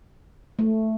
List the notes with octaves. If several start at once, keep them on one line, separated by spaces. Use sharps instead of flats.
A3